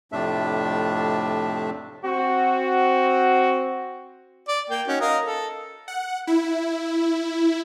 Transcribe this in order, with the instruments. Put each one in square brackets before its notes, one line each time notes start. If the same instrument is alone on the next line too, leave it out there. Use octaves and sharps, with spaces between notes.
[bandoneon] F2 A2 C3 A3 D4 E5
[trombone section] C4 F#4
[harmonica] D5
A#3 G5
C#4 D#4 F#4
A#4 D#5 F5
A4
[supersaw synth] F#5
E4